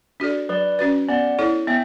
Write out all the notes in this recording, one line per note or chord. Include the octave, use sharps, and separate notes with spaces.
D4 F#4 A4 D5
F#3 B4 D5
C#4 F#4 B4
B3 D5 F#5
E4 A4 C#5
B3 E5 G5